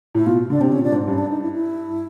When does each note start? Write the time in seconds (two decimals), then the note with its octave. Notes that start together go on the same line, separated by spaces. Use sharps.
0.15 A2 E4
0.26 B2 F4
0.50 D3 D4
0.61 C3 C4
0.72 C#4
0.76 A#2
0.84 D4
0.92 G#2
1.07 G2 C#4
1.18 D4
1.30 D#4
1.42 E4
1.53 E4